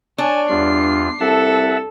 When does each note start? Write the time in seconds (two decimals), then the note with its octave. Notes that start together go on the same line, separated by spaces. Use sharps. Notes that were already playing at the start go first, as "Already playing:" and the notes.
0.18 D4 C#5 G#5 A5
0.49 E2 G2 F4 C7
1.20 C2 A4 E5 F#5 A5